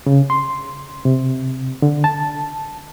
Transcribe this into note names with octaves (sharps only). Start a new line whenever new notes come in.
C#3
C6
C3
D3
A5